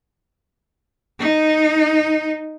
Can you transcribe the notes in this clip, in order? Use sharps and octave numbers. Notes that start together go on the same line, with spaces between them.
D#4